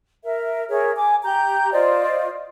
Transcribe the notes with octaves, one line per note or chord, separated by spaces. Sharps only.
A#4 E5
G#4 A#4 C#5 E5
G#5 D6
G4 A#5 G6
F4 C5 D5 D#5